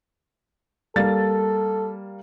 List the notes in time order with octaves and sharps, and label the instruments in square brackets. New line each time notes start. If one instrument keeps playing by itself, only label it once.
[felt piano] G3 A#3 A6 [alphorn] A4